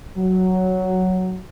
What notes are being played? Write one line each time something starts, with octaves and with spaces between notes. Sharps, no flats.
F#3